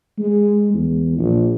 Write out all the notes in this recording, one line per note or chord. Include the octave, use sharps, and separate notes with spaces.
G#3
E2
A#1